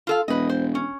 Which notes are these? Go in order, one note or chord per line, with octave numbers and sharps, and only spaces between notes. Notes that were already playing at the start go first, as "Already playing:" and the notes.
F4 A4 F5
E1 B4 D#5
C5
C#4